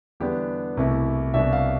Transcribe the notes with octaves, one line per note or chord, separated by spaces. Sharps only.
E2 D3 G3 B3 D4 G4
C2 B2 A3 E4
C2 B2 G3 D4 E5
F5